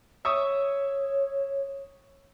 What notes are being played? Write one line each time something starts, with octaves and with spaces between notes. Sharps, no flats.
C#5 E5 C#6 D#6